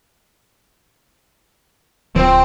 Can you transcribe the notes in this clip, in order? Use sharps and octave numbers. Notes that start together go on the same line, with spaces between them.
D1 F3 C4